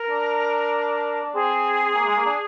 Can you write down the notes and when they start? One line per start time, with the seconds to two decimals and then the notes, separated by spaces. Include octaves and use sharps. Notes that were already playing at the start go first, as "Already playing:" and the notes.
Already playing: A#4
0.10 D4
1.24 D4
1.34 C4 G#4
1.84 C4
1.94 A#3
2.06 G#3
2.16 A#3
2.26 D4